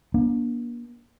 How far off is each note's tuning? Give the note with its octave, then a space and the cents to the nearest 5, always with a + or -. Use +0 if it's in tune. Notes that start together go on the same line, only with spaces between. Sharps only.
A#3 +40 D4 -20